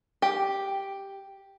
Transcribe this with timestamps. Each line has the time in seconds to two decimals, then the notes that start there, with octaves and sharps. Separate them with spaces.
0.22 G4